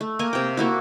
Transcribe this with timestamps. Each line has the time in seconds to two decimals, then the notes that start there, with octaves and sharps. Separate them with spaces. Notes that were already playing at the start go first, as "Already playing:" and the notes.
0.01 A3
0.19 A#3 A#4 G#5
0.33 C3 G5
0.57 A#3 E4 F#4